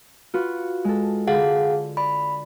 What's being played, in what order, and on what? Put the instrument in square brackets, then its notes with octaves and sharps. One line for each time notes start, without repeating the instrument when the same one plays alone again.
[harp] F4 F#4 B4
G#3 A4
[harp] D3 [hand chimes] G#4 F5 F#5
[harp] D5 [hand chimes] B5